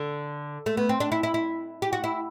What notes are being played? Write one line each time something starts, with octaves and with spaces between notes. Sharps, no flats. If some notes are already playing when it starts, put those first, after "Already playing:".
Already playing: D3
A3
B3
C4
D4
E4
E4
E4
G4
F#4
E4